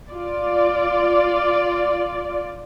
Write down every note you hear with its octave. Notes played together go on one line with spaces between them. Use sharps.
F4 D5